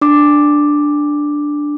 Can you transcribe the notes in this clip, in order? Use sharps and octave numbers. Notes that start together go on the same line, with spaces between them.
D4 D6